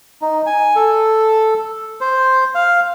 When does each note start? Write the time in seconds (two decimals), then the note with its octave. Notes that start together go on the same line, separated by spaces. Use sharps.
0.22 D#4
0.46 G#5
0.76 A4
2.01 C5
2.55 F5